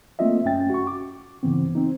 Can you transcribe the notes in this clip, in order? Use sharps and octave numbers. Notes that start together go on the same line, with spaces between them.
A3 A#3 C4 F4 D#5 E5
F#2 C#4 G5 A6
F#4 C#6
D6
G2 C#3 E3 B3 C4
C4 D#4